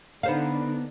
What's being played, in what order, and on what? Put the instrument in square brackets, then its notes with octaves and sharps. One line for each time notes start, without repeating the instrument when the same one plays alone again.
[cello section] D3 D4 D#4 [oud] B3 C5 F5